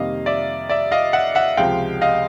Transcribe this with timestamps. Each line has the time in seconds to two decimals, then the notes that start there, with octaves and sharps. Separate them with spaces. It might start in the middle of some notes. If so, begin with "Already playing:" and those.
Already playing: F2 C3 D#3 G3 A#3 D#5 F5
0.26 D5 E5
0.69 D5 E5
0.91 D#5 F5
1.13 E5 F#5
1.35 E5 F#5
1.57 C#2 C3 F3 G#3 F5 G5
2.01 D#5 F5